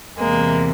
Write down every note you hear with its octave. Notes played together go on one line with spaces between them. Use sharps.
E2 C3 E3 G#3 A#3